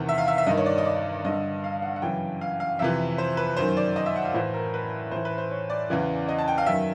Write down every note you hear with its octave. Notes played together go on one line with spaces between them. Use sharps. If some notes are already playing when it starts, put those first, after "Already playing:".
Already playing: E2 C3 D#3
E5
F5
E5
E5
G2 D#3 D#5
C#5
D5
D#5
D5
G2 D3 D#5
F5
F#5
F#5
F#2 C#3 E3 G5
F5
F5
F2 C3 E3 E5
C5
B4
F#2 D#3 C5
D5
D#5
E5
F#5
F5
A2 E3 C5
A#4
B4
A2 E3 C5
B4
C5
C#5
D5
E2 C#3 E3
D#5
A5
G5
F5
F#2 D#3 E5